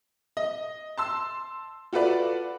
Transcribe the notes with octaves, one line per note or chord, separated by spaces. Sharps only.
D#5
A5 C6 E6
F4 F#4 A4 B4 D5